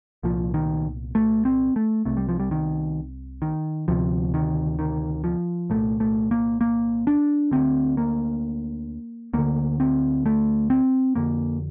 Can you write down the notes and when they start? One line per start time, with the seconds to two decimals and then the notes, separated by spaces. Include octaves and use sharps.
0.23 C2 A#2 F3
0.54 D#3
1.15 A3
1.45 C4
1.76 A3
2.05 C2 C3 A3
2.17 G3
2.29 F3
2.40 G3
2.51 D#3
3.42 D#3
3.88 D2 C3 F3
4.34 D#3
4.79 D#3
5.24 F3
5.70 C2 A#2 A3
6.00 A3
6.31 A#3
6.61 A#3
7.07 D4
7.51 D2 D3 C4
7.97 A#3
9.33 D2 D3 A#3
9.80 C4
10.26 A3
10.70 C4
11.15 F2 D3 A#3